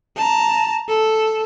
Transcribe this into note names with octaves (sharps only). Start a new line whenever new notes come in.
A5 A#5
A4